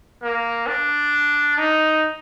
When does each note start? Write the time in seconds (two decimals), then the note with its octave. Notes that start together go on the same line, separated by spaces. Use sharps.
0.23 A#3
0.67 D4
1.58 D#4